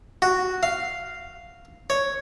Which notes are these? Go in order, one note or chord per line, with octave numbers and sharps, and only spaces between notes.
F#4
F5
C#5